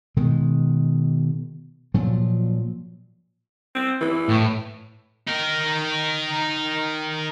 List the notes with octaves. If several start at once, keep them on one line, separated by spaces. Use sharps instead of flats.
B2 D#3 G#3
A#2 F3 F#3
C4
E3
A2
D#4 A#4